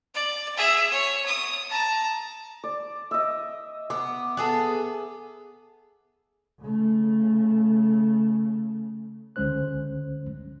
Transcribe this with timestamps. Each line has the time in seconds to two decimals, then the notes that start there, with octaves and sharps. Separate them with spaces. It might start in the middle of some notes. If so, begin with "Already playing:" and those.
0.15 D5
0.56 G#4 E5
0.91 C#5
1.26 D#6
1.69 A5 A#5
2.64 D5
3.11 D#5 E5
3.90 B3 D6
4.37 B3 G#4 A4
6.59 C#3 A3
9.36 C#2 D3 G#3 C#4 C5 F#6